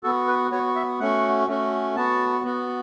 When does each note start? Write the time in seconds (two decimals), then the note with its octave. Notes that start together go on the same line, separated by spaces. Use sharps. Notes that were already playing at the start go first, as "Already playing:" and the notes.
0.03 F#4 A4
0.06 B3
0.27 B4
0.51 B3 F#4 C#5
0.76 E5
1.00 A3 C#4 F#4 F#5
1.48 A3 C#4 F#4
1.96 B3 F#4 A5
2.45 B3 F#4